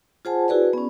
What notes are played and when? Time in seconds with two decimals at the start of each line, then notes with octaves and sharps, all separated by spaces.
0.25 F4 G#4 C5 F#5 G#5 A5
0.48 E4 F#4 G#4 B4 D5
0.73 B3 C#4